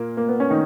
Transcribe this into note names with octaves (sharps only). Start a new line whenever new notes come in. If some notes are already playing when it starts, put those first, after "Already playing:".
Already playing: A#2 A#3
A#3
B3
C#4
D#3 D#4